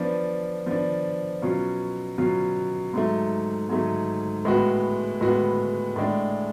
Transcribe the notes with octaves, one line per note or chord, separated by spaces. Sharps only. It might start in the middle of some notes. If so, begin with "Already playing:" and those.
Already playing: F3 B3 D4
F3 B3 D4
B2 F#3 C#4 F4
B2 F#3 C#4 F4
G#2 F#3 A3
G#2 F#3 A3
A2 G#3 B3 F#4
A2 G#3 B3 F#4
A2 G#3 D4